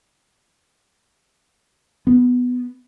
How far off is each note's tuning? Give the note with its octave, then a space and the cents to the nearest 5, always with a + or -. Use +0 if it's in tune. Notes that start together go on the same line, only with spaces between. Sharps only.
B3 +5